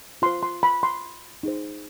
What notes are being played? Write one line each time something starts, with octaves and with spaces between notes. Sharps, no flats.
F4 C5 C6
C6
B5
C6
D#4 G#4 C5